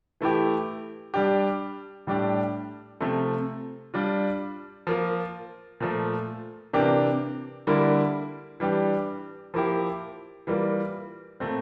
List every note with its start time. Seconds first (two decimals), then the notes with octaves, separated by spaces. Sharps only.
0.21 E3 A3 E4 G4
1.14 G3 D4 G4
2.07 A2 G3 D4 G4
3.00 C3 F3 A3
3.94 G3 D4 F4
4.87 F3 A#3 F4
5.80 A#2 F3 A3
6.73 C3 E3 A#3 D4 G4
7.67 D3 G3 A#3 E4
8.60 E3 G3 D4 G4
9.54 F3 A#3 E4 G4
10.47 E3 G3 A#3 F4
11.40 A#2 A3 C4